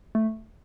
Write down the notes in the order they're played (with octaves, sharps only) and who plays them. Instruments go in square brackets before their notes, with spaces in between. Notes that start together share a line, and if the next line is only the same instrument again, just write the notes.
[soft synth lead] A3